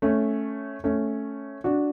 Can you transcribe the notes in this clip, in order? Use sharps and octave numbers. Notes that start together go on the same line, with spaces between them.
A3 C#4
A3 C#4
D4 F#4